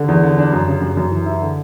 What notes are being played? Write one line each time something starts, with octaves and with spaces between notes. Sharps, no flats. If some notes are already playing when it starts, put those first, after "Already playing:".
Already playing: D3
E2
D3
D4
F#2
C#3
F#2
F#2
E3
E4
D3